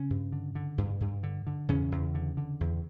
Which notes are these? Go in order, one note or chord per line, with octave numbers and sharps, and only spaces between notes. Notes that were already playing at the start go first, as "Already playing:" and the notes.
Already playing: C#3 C#4
G2
D3
D3
G2
G2
D3
D3
E2 C#3 C#4
E2
D3
D3
E2